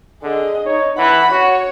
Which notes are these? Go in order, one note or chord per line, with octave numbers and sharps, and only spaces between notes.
D3 G#4 D#5
D#4 C#5
E3 F#5 B5
F#4 C#5